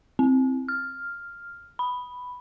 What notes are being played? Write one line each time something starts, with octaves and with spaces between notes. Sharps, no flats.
C4
F6
B5